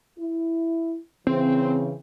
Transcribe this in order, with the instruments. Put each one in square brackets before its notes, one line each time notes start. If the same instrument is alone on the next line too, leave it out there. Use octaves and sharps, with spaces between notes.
[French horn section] E4
[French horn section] C#3 E3 [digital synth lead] C4